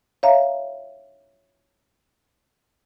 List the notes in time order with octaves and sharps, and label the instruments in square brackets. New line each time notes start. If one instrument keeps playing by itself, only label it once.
[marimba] C#5 E5 F5 A#5